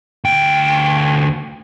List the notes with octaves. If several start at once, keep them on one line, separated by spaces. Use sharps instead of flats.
D2 G5